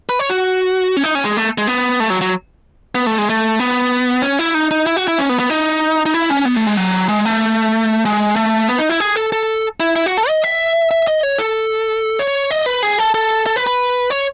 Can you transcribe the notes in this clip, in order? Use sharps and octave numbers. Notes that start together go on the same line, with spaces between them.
B4
C#5
F#4
C#4
D#4
C#4
G#3
A3
G#3
B3
A3
F#3
F#3
B3
A3
G#3
A3
B3
C#4
E4
D#4
D#4
E4
F#4
E4
C#4
B3
B3
D#4
D#4
E4
C#4
B3
A3
G#3
F#3
G#3
A3
G#3
A3
B3
D#4
E4
G#4
A4
A4
E4
E4
F#4
A4
D#5
E5
E5
D#5
C#5
A4
C#5
D#5
B4
G#4
A4
A4
A4
B4
B4
C#5